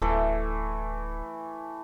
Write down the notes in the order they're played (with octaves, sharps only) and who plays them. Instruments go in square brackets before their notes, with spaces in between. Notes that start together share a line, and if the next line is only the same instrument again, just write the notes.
[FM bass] D1 [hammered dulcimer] E3 A3